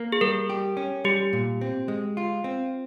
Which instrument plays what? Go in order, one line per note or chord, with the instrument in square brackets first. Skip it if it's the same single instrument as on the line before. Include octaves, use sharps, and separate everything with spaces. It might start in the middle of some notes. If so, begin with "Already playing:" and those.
Already playing: [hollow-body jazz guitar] A#3
[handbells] G#4
[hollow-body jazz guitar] G3 [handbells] A#4
[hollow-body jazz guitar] G4
C#4
[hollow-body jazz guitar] G3 [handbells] G4
[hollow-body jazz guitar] A#2
C4
G#3
F4
C4